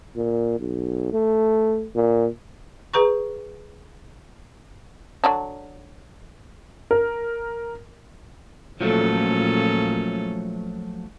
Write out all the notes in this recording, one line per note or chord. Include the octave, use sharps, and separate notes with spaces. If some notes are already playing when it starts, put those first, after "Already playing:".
A#2
B1
A3
A#2
G#4 B4 A#5 C#6
D3 F#3 D4
A#4
A#2 F3 F#3 A3 C#4 A4